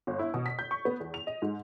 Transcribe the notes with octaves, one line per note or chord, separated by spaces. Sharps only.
G1
E4
B2
B6
G6
C#6
B3
E2
F7
D#5
G#2